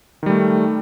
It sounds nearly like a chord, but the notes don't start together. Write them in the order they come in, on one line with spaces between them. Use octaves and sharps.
D#3 G3 A3